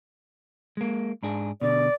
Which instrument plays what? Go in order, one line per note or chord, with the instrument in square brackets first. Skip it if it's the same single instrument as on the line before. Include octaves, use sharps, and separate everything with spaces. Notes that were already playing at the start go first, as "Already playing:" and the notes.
[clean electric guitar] G#3 A#3
G#2 D4 G#4
[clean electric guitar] B2 D3 [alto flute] D5